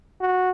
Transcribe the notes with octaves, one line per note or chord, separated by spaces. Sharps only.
F#4